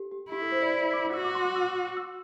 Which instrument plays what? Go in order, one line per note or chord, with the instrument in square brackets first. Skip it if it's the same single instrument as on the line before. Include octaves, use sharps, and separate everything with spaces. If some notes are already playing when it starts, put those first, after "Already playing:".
Already playing: [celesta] G4 A4
G4
[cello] E4 [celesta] G4
[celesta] A4
C5
D5
D6
[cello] F#4 [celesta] E6
[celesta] D6
C6
D6
E6
E6